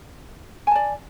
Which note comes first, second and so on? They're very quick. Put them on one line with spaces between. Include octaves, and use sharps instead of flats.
G#5 A5 D5